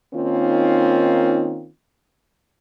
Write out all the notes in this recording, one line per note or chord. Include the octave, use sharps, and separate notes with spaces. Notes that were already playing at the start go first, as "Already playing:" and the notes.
D#3 A#3 C4 C#4 D#4 F4